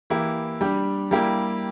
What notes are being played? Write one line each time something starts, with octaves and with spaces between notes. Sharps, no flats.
E3 A#3 E4 G4
G3 D4 G4
G3 A#3 E4 G4